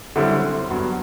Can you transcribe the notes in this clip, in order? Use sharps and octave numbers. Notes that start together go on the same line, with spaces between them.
F#2 D3 G3 C4 E4
G2 F#3 B3